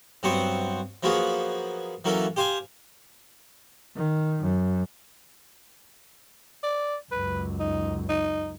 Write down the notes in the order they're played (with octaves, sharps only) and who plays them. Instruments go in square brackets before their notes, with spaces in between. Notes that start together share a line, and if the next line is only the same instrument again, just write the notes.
[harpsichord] G2 F#3 B3 C4 C5 C#6
F3 F#3 A#3 B3 F#4 G#4
E3 F#3 A#3 C#4 A4
G4 C5 F5 G#5
[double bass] D#3
F#2
[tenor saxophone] D5
[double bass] C#2 F#2 [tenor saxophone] B4
[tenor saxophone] D#4
D#4